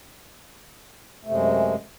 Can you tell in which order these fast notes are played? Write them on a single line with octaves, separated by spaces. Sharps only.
A3 C3 F#2 G#3